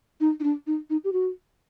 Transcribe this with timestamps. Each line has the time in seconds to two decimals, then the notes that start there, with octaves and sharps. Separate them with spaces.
0.21 D#4
0.40 D#4
0.44 D4
0.67 D#4
0.90 D#4
1.04 G4
1.13 F#4